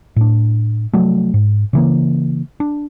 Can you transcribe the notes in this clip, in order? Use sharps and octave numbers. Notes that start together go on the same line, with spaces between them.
A2 D4
C3 F3 F#3 A3
G#2
C#3 E3 A#3
D4